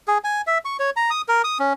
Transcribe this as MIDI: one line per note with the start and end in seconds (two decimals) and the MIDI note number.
0.08 0.18 68
0.24 0.41 80
0.47 0.58 76
0.65 0.77 85
0.79 0.90 73
0.96 1.10 82
1.10 1.22 87
1.28 1.42 70
1.44 1.58 87
1.59 1.73 61